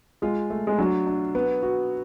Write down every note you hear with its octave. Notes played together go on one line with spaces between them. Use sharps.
G#3 F4
A3
G#3
F#3 D4
D4
B3
F#4